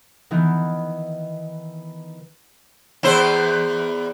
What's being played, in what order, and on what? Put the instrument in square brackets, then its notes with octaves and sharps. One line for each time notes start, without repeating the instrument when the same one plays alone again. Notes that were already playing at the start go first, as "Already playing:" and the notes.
[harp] D#3 E3 B3
[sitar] E2 E4 C5